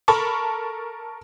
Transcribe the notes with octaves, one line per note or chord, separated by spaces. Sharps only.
A4 A#4 A5 B5 C#6